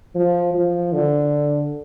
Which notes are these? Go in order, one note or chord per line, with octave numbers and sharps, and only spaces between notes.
F3
F3
D3